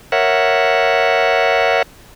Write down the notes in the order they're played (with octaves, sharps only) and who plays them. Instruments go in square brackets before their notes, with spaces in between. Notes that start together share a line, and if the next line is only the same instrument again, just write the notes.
[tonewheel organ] A#4 C#5 E5 F#5